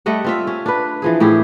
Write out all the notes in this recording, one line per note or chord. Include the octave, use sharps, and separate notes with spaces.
G3 A3 D#5 F#5
C4 F4 E5
C#4
D4 B4
E3 F3 G#4
A2 E4 G4 G#4